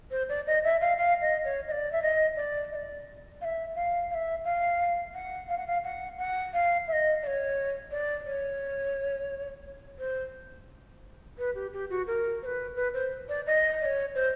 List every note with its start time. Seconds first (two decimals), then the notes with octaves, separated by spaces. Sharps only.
0.11 C5
0.29 D5
0.47 D#5
0.64 E5
0.81 F5
0.98 F5
1.21 D#5
1.44 C#5
1.68 D#5
1.72 D5
1.92 E5
2.02 D#5
2.36 D5
2.72 D#5
2.75 D5
3.41 F5
3.44 E5
3.75 F5
4.11 F5
4.14 E5
4.45 F5
5.14 F#5
5.49 F5
5.58 F#5
5.67 F5
5.84 F#5
6.18 F#5
6.53 F5
6.88 E5
6.92 D#5
7.23 D5
7.27 C#5
7.91 D5
8.26 C#5
9.99 C5
11.38 B4
11.55 G4
11.73 G4
11.90 F#4
12.07 A#4
12.43 C5
12.46 B4
12.76 B4
12.94 C5
13.29 D5
13.47 D#5
13.81 D5
13.85 C#5
14.15 C5